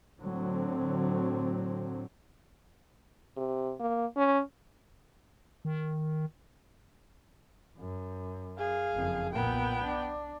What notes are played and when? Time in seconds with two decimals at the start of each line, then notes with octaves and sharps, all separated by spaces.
0.20 A2 D3 F#3 C4
3.37 C3
3.80 A#3
4.17 C#4
5.65 D#3
7.78 F#2
8.58 G#4 F5
8.94 F#1 F2
9.33 B1 A#2 B3 G5
9.84 D4